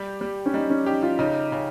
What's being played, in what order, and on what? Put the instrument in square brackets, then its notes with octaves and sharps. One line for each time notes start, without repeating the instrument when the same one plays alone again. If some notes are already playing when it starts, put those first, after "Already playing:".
Already playing: [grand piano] G3 G4
G3
[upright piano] C#4
[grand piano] G3 [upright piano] D#4
[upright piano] C#4
[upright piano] D#4 [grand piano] G4
[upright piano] F4
[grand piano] C#3 [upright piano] D#4
[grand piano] C#3